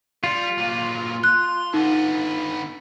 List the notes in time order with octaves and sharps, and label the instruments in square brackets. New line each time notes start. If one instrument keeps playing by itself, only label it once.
[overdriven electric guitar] G3 [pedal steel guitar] F4
[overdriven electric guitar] A#2 F#3
[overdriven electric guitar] C6 [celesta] F#6
[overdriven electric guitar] D3 B3 [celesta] D#4